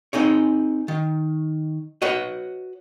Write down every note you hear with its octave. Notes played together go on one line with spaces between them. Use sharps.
C4 D#4 G#4 C#5
D#3
F#4 B4 C#5 D#5